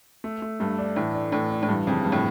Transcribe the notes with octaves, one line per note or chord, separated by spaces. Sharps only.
A3
A3
G2 A3
D4
A2 E3
D4
A2 E3
D4
A2
G2 E3
F2 C#3
G2 C#3
A2